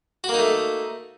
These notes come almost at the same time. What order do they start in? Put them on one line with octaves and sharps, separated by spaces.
F#4 A#3 D#4 A3